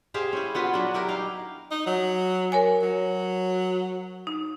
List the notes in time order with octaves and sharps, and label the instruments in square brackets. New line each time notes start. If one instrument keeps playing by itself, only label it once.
[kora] G4 G#4 C5 F5
C#4 E4
B3 F4 F#4 B4
F#3 D4
E4 G4 A#4
D#4 F5
[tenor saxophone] D#4
F#3
[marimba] A#4 C#5 G#5
[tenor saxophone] F#3
[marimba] D#4